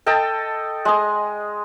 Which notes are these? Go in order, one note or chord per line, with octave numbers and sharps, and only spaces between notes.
A4 D#5 G5 A5
G#3 D#6